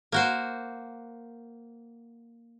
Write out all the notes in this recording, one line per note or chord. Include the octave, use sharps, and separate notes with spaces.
A#3 F#4 C5